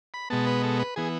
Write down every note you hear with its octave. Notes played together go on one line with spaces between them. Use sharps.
B5
B2 G#3 B3 A5
B4
A4
B4
E3 B3 G#4